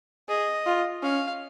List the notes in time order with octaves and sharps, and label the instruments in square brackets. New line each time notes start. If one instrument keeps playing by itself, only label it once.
[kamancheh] G#4 [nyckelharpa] D#5
[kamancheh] F4
[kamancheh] C#4 [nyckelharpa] F5